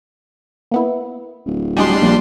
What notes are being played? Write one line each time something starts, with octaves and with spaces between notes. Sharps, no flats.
A#3 B3 E4
D1
G3 D4 F#4 G#4 D#5 C6
A#1